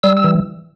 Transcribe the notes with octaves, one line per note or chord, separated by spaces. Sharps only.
G3 E6
E6
E3